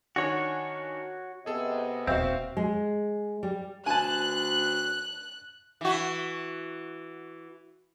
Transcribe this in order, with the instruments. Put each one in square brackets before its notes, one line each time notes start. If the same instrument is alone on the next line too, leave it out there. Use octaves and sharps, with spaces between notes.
[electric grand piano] D#3 D4 G#5 [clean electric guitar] F#4 C#5
[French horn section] C3 B3 D#5 [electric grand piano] G#4 A4
[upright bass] D#1 [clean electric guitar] C4 [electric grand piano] F#4 E5 F5
[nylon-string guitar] G#3
G3
[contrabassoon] D2 [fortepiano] G#5 A5 [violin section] F#6
[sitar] E3 F#4